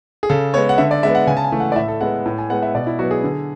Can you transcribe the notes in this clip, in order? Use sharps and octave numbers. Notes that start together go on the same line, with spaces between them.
G#4
C#3 A4
G#3 B3 C#5
F#5
D3 E5
D5
G#3 B3 E5
F#5
C#3 G#5
A5
G#5
E3 A3
F#5
D5
A2 E5
A4
G#3 B3 F#5
A2
G#5
G#3 B3 F#5
E5
B2 D5
E4
F#3 B3 F#4
G#4
D3